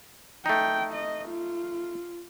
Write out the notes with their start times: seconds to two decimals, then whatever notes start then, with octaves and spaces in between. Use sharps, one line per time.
0.46 A3 D#4 G5
0.93 D#5
1.29 F4